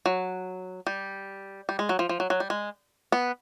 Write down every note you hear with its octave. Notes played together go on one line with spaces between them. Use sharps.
F#3
G3
G3
G#3
F#3
F3
F3
F#3
F#3
G3
G#3
B3